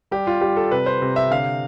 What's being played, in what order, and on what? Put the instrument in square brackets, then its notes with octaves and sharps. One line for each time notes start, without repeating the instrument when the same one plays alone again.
[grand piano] G3 G4
F4
G3 G4
A4
C3 B4
C5
C3
E5
D3 F5